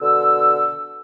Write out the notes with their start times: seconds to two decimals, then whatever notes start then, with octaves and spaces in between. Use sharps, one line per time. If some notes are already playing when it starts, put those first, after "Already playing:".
0.01 B2 D3 E6